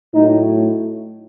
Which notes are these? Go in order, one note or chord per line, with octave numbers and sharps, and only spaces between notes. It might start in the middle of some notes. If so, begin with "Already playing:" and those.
A2 F#3 A3 D#4